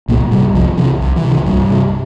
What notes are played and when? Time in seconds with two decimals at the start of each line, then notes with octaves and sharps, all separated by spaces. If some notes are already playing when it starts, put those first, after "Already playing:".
0.09 C2 A#2 A#3
0.31 G2 C3 G3
0.54 C2 F2 F3
0.77 C3 E3
1.01 C2
1.16 E3
1.24 C3
1.31 E3
1.46 C2 G2 G3
1.70 C3